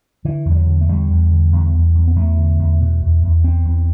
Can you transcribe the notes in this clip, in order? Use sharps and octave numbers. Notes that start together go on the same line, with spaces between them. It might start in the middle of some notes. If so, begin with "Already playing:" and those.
D3 E3
E2
G3
F#3
D3
A3
E2 G3
E2
D3
E2
E2
E2
B3
E2 A3
D3
E2
B2
E2
E2
E2 C4
E2